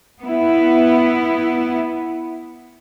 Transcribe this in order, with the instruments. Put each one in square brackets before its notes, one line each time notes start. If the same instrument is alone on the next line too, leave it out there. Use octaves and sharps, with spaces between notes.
[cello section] B3 E4